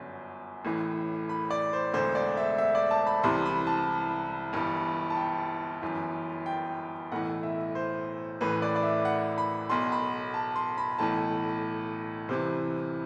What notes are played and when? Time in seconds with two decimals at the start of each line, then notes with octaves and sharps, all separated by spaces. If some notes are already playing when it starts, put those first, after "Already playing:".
Already playing: G1 F#2 D3
0.65 A1 A2 E3
1.29 B5
1.51 D5
1.73 C5
1.94 E1 D2 D3 C5
2.15 D5
2.37 E5
2.58 E5
2.75 D5
2.91 A5
3.07 B5
3.24 C2 C3 E3 C6
3.45 B5
3.67 A5
4.53 G1 G2 E3
5.10 A5
5.17 G5
5.82 G1 F#2 E3
6.46 G5
7.12 B1 A2 E3 F#5
7.43 E5
7.75 C5
8.41 A1 A2 E3 B4
8.62 D5
8.76 D5
8.83 E5
9.05 F#5
9.38 B5
9.70 B1 B2 C6
9.92 B5
10.34 A5
10.56 C6
10.78 B5
10.98 B1 A2 E3 A5
12.28 C2 C3 E3 C5